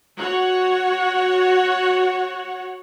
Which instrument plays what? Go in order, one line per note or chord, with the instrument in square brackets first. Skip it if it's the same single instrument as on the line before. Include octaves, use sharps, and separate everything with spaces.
[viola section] F#4 C#5 F#5